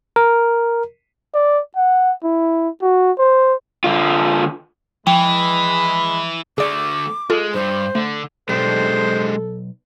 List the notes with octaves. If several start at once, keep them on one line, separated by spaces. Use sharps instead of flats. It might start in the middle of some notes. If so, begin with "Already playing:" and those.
A#4
D5
F#5
E4
F#4
C5
D3 F4
E3 F3 G#3 G5 B5 C#6
D3 A3 G#4 D5 D6
G#3 F4 A4
G2 C5
D3 A3
B1 G#3 D4 G4 A4 C5